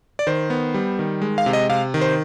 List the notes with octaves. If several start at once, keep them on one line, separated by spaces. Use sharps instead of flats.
D5
D#3 C5
B3
G3
D#3
G#3
F5
C3
D#5
C3 F5
D#3
C5